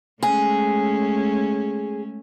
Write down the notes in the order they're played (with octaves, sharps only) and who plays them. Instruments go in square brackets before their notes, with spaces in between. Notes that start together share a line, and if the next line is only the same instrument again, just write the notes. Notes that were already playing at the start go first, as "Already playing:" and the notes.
[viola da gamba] G#3 A3 C#4 [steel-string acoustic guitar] G#4